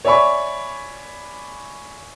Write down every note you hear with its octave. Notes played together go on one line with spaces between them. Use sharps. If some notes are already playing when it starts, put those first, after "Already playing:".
C#5 D5 E5 G#5 B5 C#6